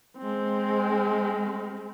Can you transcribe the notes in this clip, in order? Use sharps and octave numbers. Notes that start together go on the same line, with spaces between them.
G#3 C4